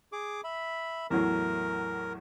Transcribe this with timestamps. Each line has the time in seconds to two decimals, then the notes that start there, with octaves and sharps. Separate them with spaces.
0.12 G#4 D6
0.44 E5 B5
1.10 E2 A2 F#3 A#4